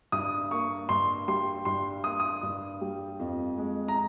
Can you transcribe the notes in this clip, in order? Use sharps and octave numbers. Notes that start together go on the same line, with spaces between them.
G2 D#6
A#3 C#6
G2 C6
G3 C6
G2 C6
A#3 D#6
D#6
G2
G3
F2
G#3
A#5